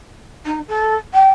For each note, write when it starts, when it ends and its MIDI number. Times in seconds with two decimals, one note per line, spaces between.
0.45 0.59 63
0.68 0.96 69
1.14 1.31 79